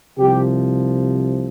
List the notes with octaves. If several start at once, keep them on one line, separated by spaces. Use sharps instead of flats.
C2 C3 F3 G4